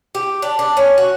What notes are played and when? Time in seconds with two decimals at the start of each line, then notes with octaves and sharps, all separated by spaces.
0.15 G4
0.42 D4
0.59 D4
0.77 C#4
0.98 F#4